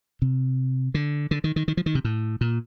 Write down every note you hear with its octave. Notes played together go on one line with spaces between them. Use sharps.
C3
D3
D3
D#3
D#3
D#3
F3
D#3
C3
A2
A#2